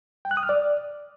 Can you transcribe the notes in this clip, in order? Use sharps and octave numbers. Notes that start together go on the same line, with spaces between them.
G5
F#6
D#6
F6
D5